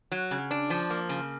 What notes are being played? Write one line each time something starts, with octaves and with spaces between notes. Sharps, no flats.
F#3
C#3
D4
F3
A#3
C#3